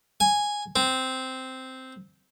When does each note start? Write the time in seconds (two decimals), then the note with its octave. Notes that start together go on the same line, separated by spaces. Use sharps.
0.20 G#5
0.76 C4